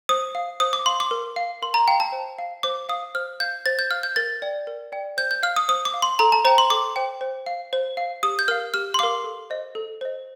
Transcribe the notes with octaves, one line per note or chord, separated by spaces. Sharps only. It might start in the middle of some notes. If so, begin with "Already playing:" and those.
C5 D#6
F5
C5 D#6
D6
F5 C6
D6
A#4
F5
A#4 C6
A#5
F5 G5
A5
C5
F5
C5 D6
F5 D#6
C5 F6
F5 G6
C5 A6
G6
F5 F6
G6
A#4 A6
D5 G5
A#4
D5 G5
C5 G6
G6
F5 F6
D#6
C5 D#6
D6
F5
C6
A4 A#5
A5
C5 G5 A#5
C6
A4 D6
C5 G5
C5
F5
C5
F5
G4 D#6
G6
A#4 F5 F6
G4 F6
C6
A#4 F5 D6
A4
C5 D#5
A4
C5 D#5